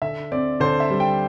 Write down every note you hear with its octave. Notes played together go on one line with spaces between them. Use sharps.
D3 E5
C4 D5
D3 C5
E5
G3
G5